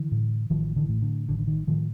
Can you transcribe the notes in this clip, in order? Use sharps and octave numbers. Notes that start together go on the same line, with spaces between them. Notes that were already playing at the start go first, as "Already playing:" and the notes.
Already playing: D3 E3
A2
A1 D#3 F3
D3 E3
A2
D3
A1 D3
D3
D#3
A2 D#3 F3